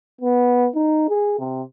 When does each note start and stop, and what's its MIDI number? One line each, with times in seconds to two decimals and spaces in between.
0.21 0.67 59
0.75 1.05 63
1.09 1.36 68
1.39 1.62 48